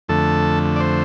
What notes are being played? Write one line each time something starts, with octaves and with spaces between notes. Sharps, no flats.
F2 D3 A3 A4
D5
C5